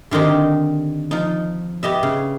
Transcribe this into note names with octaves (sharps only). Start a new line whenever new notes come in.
D3 D#3 C4 D#4 G4
F3 D#4
B3 G4 D#5 E5
C#3